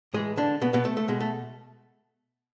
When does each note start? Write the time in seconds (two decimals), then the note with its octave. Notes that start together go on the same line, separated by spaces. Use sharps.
0.14 A2 E3 G#3 G#4
0.37 D3 D4
0.62 B2 B3
0.73 B2 B3
0.85 A3
0.97 A3
1.08 B2 G#3
1.20 A3